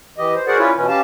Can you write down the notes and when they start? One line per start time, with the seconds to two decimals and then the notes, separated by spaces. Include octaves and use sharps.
0.18 E3 G4 D#5
0.35 C5
0.47 F#4 G#4 A#4 C5 D5 F#5
0.58 C#4 E4 F4 B4 C#5 D5
0.76 B2 E3 C#4
0.88 C#4 G4 F5 A5